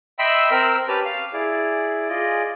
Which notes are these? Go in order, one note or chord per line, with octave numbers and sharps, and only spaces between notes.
D#5 E5 G5 B5 C6 E6
C4 A#4 E6
C#4 G4 B4 A5 F6
F5
E4 G#4 D5
F4 G#4 D5 D#5